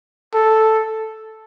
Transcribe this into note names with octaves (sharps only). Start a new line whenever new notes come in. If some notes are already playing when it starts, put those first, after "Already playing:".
A4